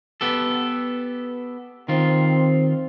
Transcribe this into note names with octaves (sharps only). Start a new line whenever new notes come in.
B3 G4 A4
D#3 C4 F4